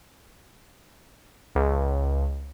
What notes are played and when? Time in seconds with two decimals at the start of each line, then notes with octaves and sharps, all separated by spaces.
1.55 C#2